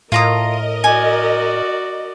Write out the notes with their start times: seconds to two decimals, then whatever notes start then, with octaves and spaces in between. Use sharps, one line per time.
0.12 A2 F4 A#4 D#5 A#5 D#6
0.84 F#4 D5 G#5